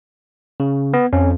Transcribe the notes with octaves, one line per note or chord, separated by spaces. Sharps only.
C#3
B3
F2 C#4